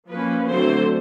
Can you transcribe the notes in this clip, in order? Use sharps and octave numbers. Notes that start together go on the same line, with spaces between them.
F3 A#3 C#4 B4
D3 F#3 A3 C4 C5